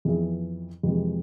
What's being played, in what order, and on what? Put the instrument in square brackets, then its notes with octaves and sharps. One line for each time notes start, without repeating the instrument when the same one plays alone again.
[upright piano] F2 E3 B3 E4 G#4
F2 C3 E3 G#3